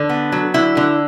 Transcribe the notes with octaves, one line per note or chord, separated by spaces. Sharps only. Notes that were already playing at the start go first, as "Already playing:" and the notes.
Already playing: D3 D4
B3
F#3
D3 E4
D3